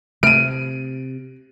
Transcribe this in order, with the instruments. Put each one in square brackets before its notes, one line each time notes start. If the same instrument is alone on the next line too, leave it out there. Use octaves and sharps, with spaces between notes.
[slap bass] C3 [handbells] A3 F6 [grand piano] D7 D#7